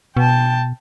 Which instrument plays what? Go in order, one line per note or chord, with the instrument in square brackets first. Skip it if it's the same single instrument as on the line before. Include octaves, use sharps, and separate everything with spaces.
[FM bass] B2 [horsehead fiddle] G5 A5